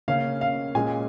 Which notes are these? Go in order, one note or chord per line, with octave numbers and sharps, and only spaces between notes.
C#3 A#3 C#4 F5
F5
A#2 G#3 C#4 G#5